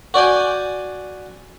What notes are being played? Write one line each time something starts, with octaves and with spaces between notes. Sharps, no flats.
F#4 D5 G5 G#5